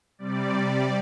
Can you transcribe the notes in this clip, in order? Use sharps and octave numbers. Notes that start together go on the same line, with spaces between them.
C3 G3 D5